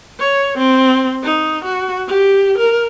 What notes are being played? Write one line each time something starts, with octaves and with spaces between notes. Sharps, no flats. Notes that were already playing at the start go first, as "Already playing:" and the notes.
C#5
C4
D#4
F#4
G4
A#4